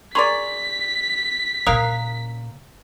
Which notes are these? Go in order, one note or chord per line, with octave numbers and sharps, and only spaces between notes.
G#4 A#4 D5 C6 C#6 B6
A#2 C#3 A#3 A#4 F5 D#6 F#6